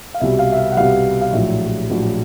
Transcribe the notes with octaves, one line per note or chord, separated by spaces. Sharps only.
F5
C2 B2 G3 E5
F5
E5
F5
F#5
C2 B2 G3 F5
F5
A#1 A2 F#3 E5
A#1 A2 F#3